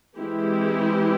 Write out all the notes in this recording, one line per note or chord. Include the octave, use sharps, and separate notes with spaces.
E3 G#3 C4 E4 G4